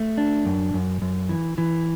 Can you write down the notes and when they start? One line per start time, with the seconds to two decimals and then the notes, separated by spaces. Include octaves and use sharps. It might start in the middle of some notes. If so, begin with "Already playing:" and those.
Already playing: A3
0.18 D4
0.45 F#2
0.74 F#2
1.02 F#2
1.29 E3
1.58 E3